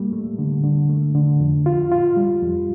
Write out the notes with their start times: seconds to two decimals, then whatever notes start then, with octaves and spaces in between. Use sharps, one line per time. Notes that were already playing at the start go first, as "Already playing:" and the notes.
Already playing: G3 A#3
0.13 A3
0.38 D3
0.64 D3
0.89 A3
1.15 D3
1.40 F2
1.66 F4
1.91 F4
2.17 G3
2.42 F2